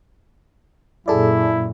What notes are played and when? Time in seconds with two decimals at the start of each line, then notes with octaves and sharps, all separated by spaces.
1.08 F#2 A#2 E4 G#4 A4 D5